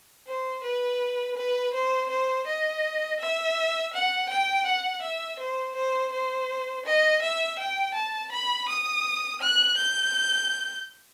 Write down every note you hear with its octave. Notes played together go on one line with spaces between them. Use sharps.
C5
B4
B4
C5
C5
D#5
E5
F#5
G5
F#5
E5
C5
C5
C5
D#5
E5
G5
A5
B5
D#6
F#6
G6